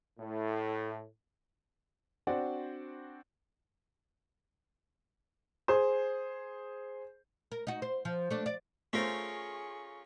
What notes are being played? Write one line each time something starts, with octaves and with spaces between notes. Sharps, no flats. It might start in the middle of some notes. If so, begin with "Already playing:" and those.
A2
C4 D4 F#4 C5 D5 F#5
G#4 C5
A#4
D#4 F#4
C5
F3
A3 D4
D5
A3 C#4 F4 G#4 A#4 C5 C#6